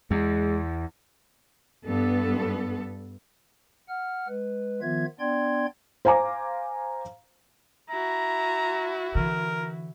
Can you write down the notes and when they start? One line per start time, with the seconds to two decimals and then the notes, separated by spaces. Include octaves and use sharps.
0.11 E2 G#3
1.87 G2 B3 A4
3.89 F#5 F6
4.28 G#3 B4
4.81 D#3 F3 B3 F4 E5 G#6
5.19 B3 D4 D5 G5 C6 G#6
6.05 C5 F5 G#5 A#5 D6
7.90 E4 F#4 A#5
9.15 D3 E3 A#4